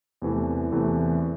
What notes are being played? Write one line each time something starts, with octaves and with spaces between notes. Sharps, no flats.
E2 C3 E3 A3
E2 C3 E3 A3